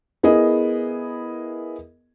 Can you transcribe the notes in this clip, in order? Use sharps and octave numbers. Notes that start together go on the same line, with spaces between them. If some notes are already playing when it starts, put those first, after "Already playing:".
B3 E4 G#4 A#4 D#5